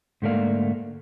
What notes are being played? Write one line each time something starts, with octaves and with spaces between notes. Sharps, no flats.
G#2 D3 A3 A#3 D5 F5